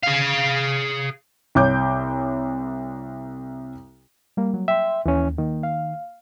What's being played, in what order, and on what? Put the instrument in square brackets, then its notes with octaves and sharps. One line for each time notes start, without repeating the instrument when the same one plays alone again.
[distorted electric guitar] G#4 F5
[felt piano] C2 C#5 D6 G6
[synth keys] G3 A#3
F#3
[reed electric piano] E5 [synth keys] G5 C6
[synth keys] D#2 [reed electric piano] E3 C#4
[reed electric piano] D#3 [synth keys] A#3
[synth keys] F5